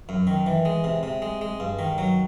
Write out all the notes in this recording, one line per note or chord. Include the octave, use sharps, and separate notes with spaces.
F#2
D#3
E3
G#3
C3
C3
G#3
G#3
G2
D#3
F#3